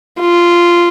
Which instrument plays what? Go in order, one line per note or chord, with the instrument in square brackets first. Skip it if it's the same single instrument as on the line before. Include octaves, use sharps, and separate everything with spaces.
[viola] F4